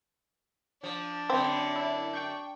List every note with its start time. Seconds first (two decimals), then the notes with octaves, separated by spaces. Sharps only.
0.83 F3 D4
1.30 F#2 D3 C4 B5 G6
1.76 E4
2.13 G5 C#6 G6